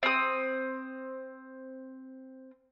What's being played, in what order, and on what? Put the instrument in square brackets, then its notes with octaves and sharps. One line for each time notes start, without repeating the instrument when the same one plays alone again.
[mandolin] C4 D#6